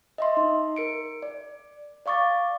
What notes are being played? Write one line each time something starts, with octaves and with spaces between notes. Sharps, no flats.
D#5 E5 C6
D#4
A#4 C#7 D7
D5
D5 F5 C#6 D6 A6